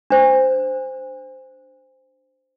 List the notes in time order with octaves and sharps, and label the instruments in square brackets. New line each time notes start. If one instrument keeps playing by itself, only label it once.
[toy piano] D4 C5